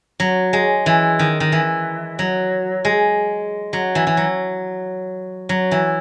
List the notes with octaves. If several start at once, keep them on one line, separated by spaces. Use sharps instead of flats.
F#3
G#3
E3
D#3
D#3
E3
F#3
G#3
F#3
E3
E3
F#3
F#3
E3